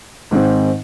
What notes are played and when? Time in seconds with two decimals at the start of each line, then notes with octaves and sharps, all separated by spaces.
0.31 G#2 D#3 C4